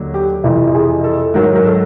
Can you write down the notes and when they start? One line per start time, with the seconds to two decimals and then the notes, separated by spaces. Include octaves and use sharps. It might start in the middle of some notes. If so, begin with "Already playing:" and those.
Already playing: D#2 D3 F#3
0.14 G4
0.44 F2 C3 E3
0.75 G#4
1.04 A4
1.34 G#2 D#3 F#3 A#4
1.56 A#4
1.65 A4